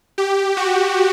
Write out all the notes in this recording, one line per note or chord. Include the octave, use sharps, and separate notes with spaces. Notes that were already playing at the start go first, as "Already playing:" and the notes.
G4
F#4